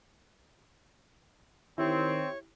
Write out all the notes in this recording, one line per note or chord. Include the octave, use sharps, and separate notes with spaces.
D#3 C4 E4 G4 C#5